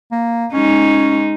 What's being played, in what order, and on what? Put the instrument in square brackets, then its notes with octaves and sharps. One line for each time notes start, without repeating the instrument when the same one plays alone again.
[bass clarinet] A#3
[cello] G#3 D#4 [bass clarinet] C#4